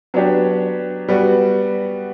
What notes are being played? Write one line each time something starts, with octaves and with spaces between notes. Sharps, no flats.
F#3 B3 D4 G4
G3 B3 F#4